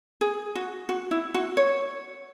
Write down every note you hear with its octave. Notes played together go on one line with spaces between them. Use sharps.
G#4
F#4
F#4
E4
F#4
C#5